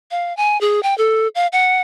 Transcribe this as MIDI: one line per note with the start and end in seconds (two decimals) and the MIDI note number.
0.11 0.35 77
0.37 0.60 80
0.61 0.82 68
0.83 0.96 79
0.98 1.28 69
1.35 1.47 77
1.52 1.82 78